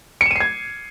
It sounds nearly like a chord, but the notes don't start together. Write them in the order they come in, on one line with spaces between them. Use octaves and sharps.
C#7 E7 D#7 C7 G#6